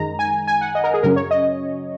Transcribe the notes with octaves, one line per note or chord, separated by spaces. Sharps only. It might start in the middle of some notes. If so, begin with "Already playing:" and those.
Already playing: F#2 D#3 G#3 A#5
G#5
G#5
F#5
D#5
A#4
G#4
F#2 C#3 F#3 C#4 A#4
C#5
D#5